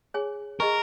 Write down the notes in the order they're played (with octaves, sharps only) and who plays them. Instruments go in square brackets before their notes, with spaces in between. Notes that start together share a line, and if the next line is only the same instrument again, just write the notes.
[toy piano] G#4 C#5 G#5
[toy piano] G#4 D#5 G#5 C#6 [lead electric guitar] A#4